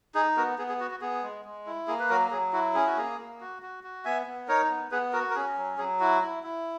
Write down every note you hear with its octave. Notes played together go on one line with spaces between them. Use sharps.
D#4 G#4
B3 F#4 A#4
B3 G#4
G#4
F#4
F#4
B3 G#4
G#3
G#3
E4
A#3 G#4
B4
F#3 F#4 A#4
F#3 G#4
E4 F#4
C#4 G#4
F#4
A#3 G#4
A#3
F#4
F#4
F#4
B3 E5 G#5
B3
D#4 A#4 C#5
B3
B3 G#4 B4
F#4 A#4
A#4
C#4 G#4
F#3
F#3 G#4
E4 F#4
E4
E4